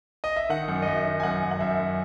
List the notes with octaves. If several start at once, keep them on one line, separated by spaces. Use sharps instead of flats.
D#5
E5
D#3 F#5
F#2
D#5
F#2 E5
D#3
G#5
F#2 F#5
F#2
F#5
F#2 E5
F#2